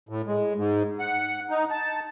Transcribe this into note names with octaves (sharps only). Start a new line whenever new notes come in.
A2
G#3
G#2
F#5
D#4
A5